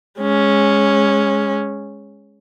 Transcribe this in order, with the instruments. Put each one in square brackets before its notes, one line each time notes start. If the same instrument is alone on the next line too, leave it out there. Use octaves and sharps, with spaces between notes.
[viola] G#3 C#4